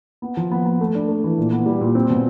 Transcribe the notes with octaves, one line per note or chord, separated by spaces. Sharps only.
B3
F3
B3
B3
A3
D4
A3
E3
A#2
B3
G3
A#2
C4
B2